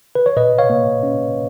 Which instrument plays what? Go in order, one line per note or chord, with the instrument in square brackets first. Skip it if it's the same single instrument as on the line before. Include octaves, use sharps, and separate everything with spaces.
[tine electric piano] B4
C#5
A#2 B4 D#5
C#5 F5
A#3
C#4